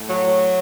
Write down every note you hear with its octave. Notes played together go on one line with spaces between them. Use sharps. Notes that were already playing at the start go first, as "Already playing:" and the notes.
Already playing: A2
F#3